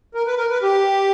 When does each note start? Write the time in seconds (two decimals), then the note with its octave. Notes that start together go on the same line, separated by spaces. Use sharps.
0.14 A#4
0.26 B4
0.38 A#4
0.50 B4
0.63 G4